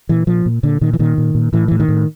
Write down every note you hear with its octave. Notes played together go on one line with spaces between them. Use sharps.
A#2 E3
A#2 F3
A#2
A#2 D3
A#2 D#3
E3
A#2 D#3
A#2
A#2
A2 E3
A2 E3
D#3
A2